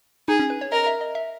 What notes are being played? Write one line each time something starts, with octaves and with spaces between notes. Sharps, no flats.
D#4 G#4
C#4
B4
C#5
A#4 D#5
E5
D#5
E5